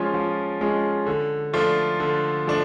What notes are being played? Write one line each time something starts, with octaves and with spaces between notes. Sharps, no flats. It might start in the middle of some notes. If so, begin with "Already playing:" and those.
Already playing: F3 G#3 C#4 F4
F3
G#3 C#4 F4
D3
F3 A3 D4 F4
D3
F3 A3 D4